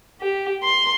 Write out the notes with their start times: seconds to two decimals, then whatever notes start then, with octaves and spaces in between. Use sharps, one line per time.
0.21 G4
0.63 C6